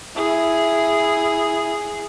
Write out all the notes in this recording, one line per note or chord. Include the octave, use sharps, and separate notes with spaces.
E4 G#4